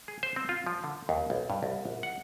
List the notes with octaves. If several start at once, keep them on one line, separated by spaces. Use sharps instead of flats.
G#4
C5
C4
F4
F3
D3
D#2
B1
G2
C2
A#1
F#5